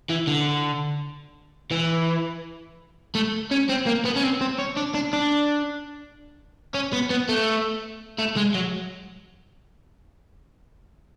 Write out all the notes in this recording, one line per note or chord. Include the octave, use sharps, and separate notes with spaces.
E3
D3
E3
A3
C#4
C4
A#3
B3
C#4
C4
C4
C#4
D4
D4
D4
C#4
B3
B3
A3
A3
G#3
F#3